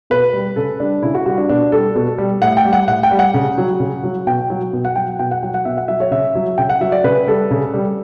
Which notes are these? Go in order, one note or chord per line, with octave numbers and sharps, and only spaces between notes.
B2 B4
G3
C#3 A4
G3 D4
C#3 E4
F#4
G3 F#4
D4
B2 D4
G3 A4
B2 A4
G3
A2 F#5
G5
G3
F#5
A2 F#5
G5
G3
F#5
C#3
F#3
C#3
F#3
B2 G5
F#3
B2
F#5
F#3 G5
B2 G5
F#5
F#3 G5
F#5
B2 E5
F#5
F#3 E5
C#5
C#3 E5
F#3
C#3 G5
F#5
F#3 E5
D5
C#3 B4
G3 A4
C#3
G3